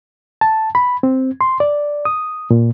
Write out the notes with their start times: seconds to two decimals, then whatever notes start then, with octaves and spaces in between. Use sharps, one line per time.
0.41 A5
0.75 B5
1.03 C4
1.41 C6
1.60 D5
2.05 D#6
2.50 A#2